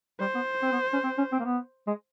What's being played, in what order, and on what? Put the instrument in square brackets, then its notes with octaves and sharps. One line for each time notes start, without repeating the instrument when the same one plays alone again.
[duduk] G3 [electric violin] C5
[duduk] B3
C4
B3
C#4
C4
C#4
C4
A#3
B3
G#3